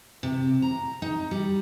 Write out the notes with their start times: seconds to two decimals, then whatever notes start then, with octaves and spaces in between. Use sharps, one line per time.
0.23 C3
0.62 A#5
1.02 D#4
1.31 G3